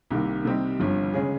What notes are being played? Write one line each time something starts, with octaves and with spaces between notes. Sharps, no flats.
C2 C3 D#3 A#3
C3 G3 C4 D#4
G1 G2 F3
C#3 G#3 C#4 G#4